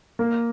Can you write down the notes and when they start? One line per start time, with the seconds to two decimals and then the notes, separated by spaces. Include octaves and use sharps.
0.19 A#3